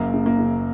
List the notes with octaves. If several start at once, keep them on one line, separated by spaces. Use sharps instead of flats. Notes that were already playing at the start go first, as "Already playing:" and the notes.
Already playing: F#1 F#2 A#3
C#3
A#3
C#3